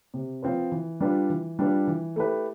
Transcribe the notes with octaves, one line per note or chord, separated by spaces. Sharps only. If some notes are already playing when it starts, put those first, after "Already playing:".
C3
F3 C4 F4 B4
E3
G3 D4 F4 B4
E3
G3 D4 F4 B4
E3
A3 E4 G4 B4